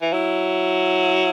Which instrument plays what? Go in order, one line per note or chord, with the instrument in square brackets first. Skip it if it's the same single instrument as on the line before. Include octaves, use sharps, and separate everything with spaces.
[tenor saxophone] E3
[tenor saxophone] F#3 [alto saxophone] E4